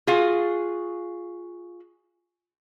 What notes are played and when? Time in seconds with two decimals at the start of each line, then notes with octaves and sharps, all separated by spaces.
0.07 F4 F#4 G#4 F5